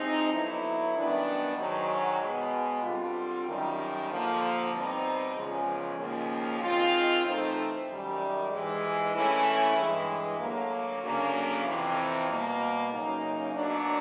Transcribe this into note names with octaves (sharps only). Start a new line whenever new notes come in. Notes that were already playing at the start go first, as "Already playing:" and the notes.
Already playing: C3 F3 G#3 C4 D#4
D3 F#3 B3 E4
F#2 D#3 G3 B3 D4
G#2 D#3 F#3
B2 G#3 B3
D3 G3 C4 F4
F#2 D#3 G3
D3 F3 A#3
B2 G3 C4 D#4
E2 C#3 F3 G#3
D#2 C#3 F3 A#3
D#3 G#3 C4 F4
C3 E3 A3 C4 D#4
F#2 D#3 G3
G#2 E3 G#3
G2 E3 A3 C#4 E4
G2 E3 G#3
D2 D3 F#3 A#3
D2 C#3 F#3 A#3 D4
F2 C3 E3
B2 G3 A#3
F#2 C#3 F#3 A#3 D#4
B2 F#3 A#3 D4